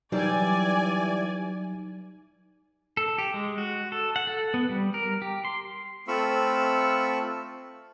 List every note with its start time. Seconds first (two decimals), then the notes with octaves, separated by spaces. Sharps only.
0.12 E3 F#3 G3 D#4 D5 G#5
2.97 A4
3.18 G4
3.34 G#3
3.58 F#4
3.92 A4
4.16 F#5
4.27 A4
4.54 B3
4.69 G3
4.94 A#4
5.22 G4
5.45 C6
6.08 A3 C4 F4 B5 C#6 E6